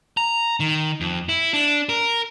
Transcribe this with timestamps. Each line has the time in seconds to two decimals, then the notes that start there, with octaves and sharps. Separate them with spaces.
0.17 A#5
0.60 D#3
1.01 F2
1.29 E4
1.53 D4
1.89 A#4